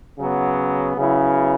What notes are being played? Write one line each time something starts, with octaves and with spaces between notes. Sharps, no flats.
C#3 F#3 B3
C#3 F#3 B3 E4